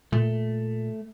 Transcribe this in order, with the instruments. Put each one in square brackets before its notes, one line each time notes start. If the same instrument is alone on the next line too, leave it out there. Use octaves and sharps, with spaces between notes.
[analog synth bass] A#2 [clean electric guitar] A3